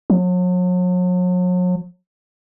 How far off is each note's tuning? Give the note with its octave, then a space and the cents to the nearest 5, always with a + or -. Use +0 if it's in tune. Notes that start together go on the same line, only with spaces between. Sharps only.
F#3 -40